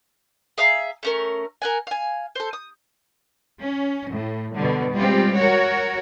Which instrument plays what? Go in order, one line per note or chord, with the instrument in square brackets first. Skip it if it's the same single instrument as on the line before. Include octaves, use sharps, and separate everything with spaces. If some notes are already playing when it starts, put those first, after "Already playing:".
[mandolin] G#4 E5 F5 A#5
A3 C#4 A#4
A#4 F#5 G#5
F5 G#5
A4 C5
D#6
[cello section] C#4
A2
B2 D3 G3
G3 G#3 C4 F4 G4
F#4 A#4 C#5